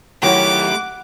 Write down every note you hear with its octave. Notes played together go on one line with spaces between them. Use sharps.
D#3 F#3 A3 E4 F#4 G4 D6